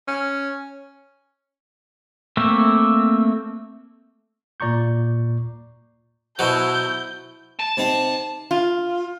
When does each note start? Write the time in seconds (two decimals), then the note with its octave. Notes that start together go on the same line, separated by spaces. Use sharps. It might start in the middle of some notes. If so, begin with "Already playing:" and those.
0.08 C#4
2.37 A3 A#3 C4 E5
4.60 A#2 D5 A#5 C#6 G6
6.39 B2 F#3 E4 C5 A5 G6
7.60 A5
7.77 C3 C4 D#4
8.51 F4